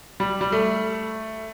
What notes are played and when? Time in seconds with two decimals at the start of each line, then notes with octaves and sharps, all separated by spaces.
0.20 G3
0.41 G3
0.52 A3